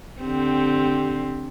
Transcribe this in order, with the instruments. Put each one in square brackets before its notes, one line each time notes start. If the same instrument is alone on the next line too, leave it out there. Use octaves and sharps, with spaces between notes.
[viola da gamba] D3 C4 G4